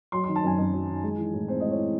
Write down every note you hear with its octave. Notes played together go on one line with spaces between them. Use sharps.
F#3 C6
C6
D#3
A5
F#2 G#5
F#2
F#3
D#3
G#3
E3
A2
C4 C5
G#3 D#5
C#5
E3